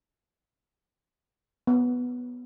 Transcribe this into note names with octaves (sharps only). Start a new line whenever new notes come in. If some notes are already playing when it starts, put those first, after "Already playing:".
B3